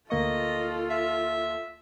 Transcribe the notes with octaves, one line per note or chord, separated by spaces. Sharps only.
D2 A#3 F4 A4 D#5 C#6
E5